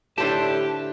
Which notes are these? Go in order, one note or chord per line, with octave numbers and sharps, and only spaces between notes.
A2 D3 G4 C5 D5 E5 A5